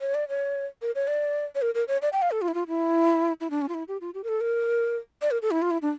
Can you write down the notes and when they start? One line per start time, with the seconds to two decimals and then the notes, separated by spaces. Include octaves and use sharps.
0.01 C#5
0.14 D5
0.29 C#5
0.82 A#4
0.95 C#5
1.07 D5
1.55 C#5
1.62 A#4
1.75 A#4
1.88 C#5
2.02 D5
2.13 G5
2.22 F5
2.31 A4
2.42 F4
2.48 E4
2.54 F4
2.68 E4
3.41 E4
3.50 D4
3.62 C#4
3.69 F4
3.74 E4
3.88 G4
4.01 F4
4.14 G4
4.24 A#4
4.28 A4
4.41 A#4
5.22 D5
5.31 A#4
5.42 A4
5.51 E4
5.62 F4
5.71 E4
5.82 D4